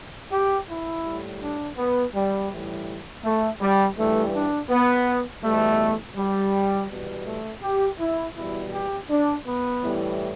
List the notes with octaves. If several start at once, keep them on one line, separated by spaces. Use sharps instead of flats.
G4
E4
A2 G3
D4
B3
G3
A2 E3 G3
A3
G3
G2 E3 G3 A3
D4
B3
E2 B2 G3 A3
G3
E2 B2 G3
A3
G4
E4
E2 B2 G3 E4
G4
D4
B3
A2 E3 G3